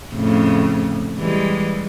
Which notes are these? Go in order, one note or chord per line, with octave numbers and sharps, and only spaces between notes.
F2 A2 C#3
E3 G3 G#3